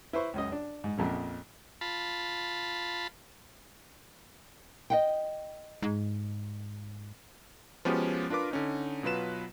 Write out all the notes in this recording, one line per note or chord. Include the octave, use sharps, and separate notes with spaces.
E4 B4 C5 C#6
C#2 F#2 D#5
D4
G#2
A#1 F2 A#2 C#3
F4 A5 B5
D#5 F#5 G5
G#2
F3 G#3 B3 C#4 F#4 G4
D4 F4 A#4 B4 D6
D3 C#4 D#4
B2 F#3 F4 B4 E7